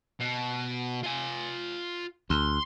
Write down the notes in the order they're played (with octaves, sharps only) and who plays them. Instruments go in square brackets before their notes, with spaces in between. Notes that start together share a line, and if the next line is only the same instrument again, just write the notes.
[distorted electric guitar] B2
F4 G#5
[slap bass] D2 [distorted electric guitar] C6